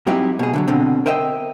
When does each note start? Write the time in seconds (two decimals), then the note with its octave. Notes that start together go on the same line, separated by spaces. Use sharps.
0.07 G#2 F#3 C4 D#4 E4 G4
0.39 B2 G#4
0.53 D3 E3 F#3
0.68 B2 D3 C4
1.06 A#4 C5 D#5 E5 G5